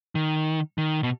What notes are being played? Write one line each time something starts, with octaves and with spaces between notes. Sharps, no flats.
D#3
D#3
B2